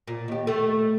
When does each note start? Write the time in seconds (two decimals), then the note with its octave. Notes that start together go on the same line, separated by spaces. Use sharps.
0.08 A#2
0.28 D#2 G4
0.47 A3